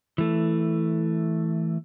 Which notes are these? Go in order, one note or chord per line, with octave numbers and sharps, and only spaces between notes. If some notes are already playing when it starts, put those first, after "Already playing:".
E3 A3